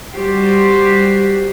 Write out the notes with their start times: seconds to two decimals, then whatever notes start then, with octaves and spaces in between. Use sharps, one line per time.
0.15 G3 F#4 G4 C5